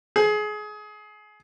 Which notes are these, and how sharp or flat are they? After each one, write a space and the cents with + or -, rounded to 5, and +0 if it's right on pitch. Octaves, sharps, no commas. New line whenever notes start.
G#4 +25